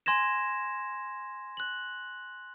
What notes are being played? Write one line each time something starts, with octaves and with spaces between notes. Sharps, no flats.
G#5 C6 G#6 A#6 E7
F#6 F#7